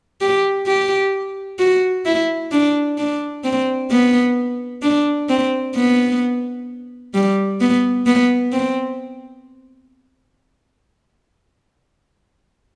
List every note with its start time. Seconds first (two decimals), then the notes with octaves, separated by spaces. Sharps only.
0.21 G4
0.67 G4
1.59 F#4
2.06 E4
2.52 D4
2.98 D4
3.44 C4
3.91 B3
4.82 D4
5.29 C4
5.76 B3
7.14 G3
7.61 B3
8.06 B3
8.53 C4